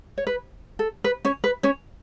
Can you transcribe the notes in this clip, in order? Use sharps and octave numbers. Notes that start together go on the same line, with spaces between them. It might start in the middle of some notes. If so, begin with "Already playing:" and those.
C#5
B4
A4
B4
C#4 C#5
B4
C#4 C#5